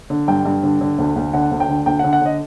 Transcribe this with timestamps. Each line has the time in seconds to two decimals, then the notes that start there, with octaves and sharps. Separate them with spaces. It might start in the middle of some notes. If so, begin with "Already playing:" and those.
0.10 D3
0.28 G2 G5
0.45 G2
0.63 D3
0.81 D3
0.99 D2
1.16 D2
1.33 D3 F#5
1.51 D2
1.60 G5
1.69 D3
1.86 D2 G5
1.99 F#5
2.04 D3
2.13 F#5
2.22 D3 D#5